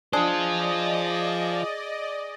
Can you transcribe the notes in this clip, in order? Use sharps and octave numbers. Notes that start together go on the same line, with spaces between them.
D4 F4 G#4 C5 D5 D#5